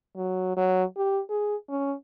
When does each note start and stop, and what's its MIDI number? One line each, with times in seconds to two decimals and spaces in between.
0.16 0.53 54
0.57 0.83 54
0.97 1.21 67
1.30 1.56 68
1.69 1.94 61